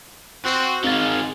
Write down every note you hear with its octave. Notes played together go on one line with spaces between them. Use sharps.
C4 F#4
D#3 G#3 C4 F5 A6